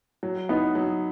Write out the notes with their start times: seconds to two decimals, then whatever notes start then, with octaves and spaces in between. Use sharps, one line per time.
0.23 F#3
0.49 B3 D#4
0.75 F#3